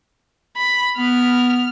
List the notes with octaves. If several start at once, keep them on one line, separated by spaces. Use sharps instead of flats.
B5
B3 F6